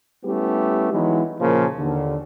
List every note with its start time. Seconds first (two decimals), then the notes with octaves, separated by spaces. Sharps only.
0.24 G3 A3 B3 C#4 E4 G4
0.92 E3 F#3 G#3 B3 D#4 E4
1.39 A#2 C#3 F3 A#3
1.77 D#2 D3